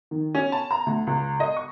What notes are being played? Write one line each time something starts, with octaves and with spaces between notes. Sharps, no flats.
D#3
C#4
A5
A#5
D2
C#2
D#5
C#6